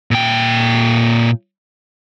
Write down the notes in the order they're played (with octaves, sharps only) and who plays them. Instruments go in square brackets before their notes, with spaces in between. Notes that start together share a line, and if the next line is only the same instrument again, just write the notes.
[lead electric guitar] A#2 G5